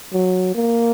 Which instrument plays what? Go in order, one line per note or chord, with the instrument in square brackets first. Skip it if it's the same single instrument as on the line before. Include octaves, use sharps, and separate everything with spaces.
[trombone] F#3
A#3